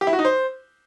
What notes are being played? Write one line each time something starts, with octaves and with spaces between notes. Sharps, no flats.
G4
E4
F#4
D#4
C5